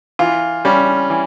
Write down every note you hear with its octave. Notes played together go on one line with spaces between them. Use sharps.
E3 F4
G3 C#4
E3